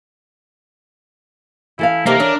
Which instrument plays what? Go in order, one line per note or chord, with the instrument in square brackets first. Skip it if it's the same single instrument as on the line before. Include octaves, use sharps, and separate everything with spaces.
[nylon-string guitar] E3 A4 F5 [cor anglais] E4
[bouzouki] C3 D#3 [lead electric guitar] A#3 [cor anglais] A#4
[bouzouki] C#4 [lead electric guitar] D4